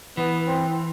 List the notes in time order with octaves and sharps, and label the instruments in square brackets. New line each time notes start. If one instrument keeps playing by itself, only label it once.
[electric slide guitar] E3 [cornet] B3
[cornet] C4